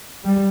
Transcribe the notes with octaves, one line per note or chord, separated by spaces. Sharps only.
G3